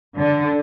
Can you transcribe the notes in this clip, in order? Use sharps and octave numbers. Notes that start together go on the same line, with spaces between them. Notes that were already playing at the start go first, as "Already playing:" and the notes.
D3